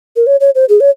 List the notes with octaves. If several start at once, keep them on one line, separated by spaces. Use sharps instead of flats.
A#4
C#5
C#5
C5
G#4
C#5